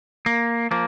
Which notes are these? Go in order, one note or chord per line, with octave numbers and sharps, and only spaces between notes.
A#3
F3 A#3